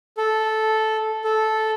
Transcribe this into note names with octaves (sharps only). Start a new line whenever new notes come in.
A4
A4